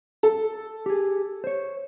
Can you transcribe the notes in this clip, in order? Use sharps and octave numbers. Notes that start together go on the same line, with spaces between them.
A4
G4 G#4
C5 C#5